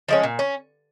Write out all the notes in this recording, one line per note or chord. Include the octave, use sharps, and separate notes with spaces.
F3 G#3 C#4
A#2
C#4